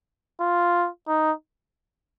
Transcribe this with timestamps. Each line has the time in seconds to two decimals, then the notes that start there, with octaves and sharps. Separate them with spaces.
0.41 F4
1.08 D#4